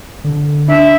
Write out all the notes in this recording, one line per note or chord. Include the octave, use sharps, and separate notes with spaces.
D3
D4 E5